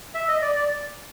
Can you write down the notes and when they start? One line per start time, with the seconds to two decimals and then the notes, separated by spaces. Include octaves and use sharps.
0.15 E5
0.28 D#5
0.42 D5
0.55 D5